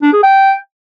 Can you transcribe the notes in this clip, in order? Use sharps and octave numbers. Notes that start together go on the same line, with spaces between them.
D4
G#4
G5